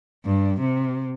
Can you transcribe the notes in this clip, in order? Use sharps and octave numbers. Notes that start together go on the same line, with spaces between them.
G2
C3